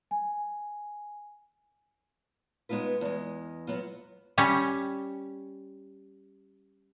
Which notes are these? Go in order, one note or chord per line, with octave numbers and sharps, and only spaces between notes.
G#5
G#3 B3 D#4 F4 B4
E2 G#3
F#3 B3 F4
G3 C#4